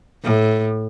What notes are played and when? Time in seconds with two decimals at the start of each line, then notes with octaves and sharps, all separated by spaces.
0.23 A2